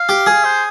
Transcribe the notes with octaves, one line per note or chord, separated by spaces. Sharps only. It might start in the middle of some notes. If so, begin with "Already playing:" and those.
Already playing: F5
G4
G#4
C5